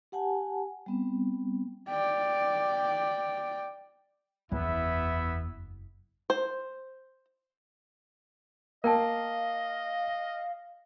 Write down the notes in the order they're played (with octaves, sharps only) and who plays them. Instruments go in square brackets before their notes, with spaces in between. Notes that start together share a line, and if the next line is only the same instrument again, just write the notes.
[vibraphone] G4 F#5 G#5 A5
G3 B3 C4
[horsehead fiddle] D5 G5
[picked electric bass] F#1 [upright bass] E2 [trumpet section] B3 E4 E5
[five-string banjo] C5
[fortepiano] A#3 [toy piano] A#4 G5 A5 [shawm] D#5 [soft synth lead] F5